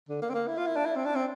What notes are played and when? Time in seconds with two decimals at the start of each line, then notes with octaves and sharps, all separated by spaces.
0.09 D3
0.22 A#3
0.30 C4
0.35 A#3
0.48 E4
0.58 F4
0.67 E4
0.76 D4
0.86 E4
0.96 C4
1.05 D4
1.15 C4